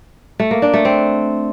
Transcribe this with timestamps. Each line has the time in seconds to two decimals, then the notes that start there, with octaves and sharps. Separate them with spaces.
0.39 A3
0.51 A#3
0.62 D4
0.74 A3
0.85 C4